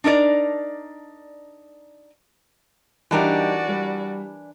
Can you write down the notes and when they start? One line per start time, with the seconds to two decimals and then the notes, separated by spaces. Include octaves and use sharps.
0.04 D4 D#4 A#4 D5
3.11 E3 G3 D4 D#4 F#4 G4 A#4 D5
3.68 G3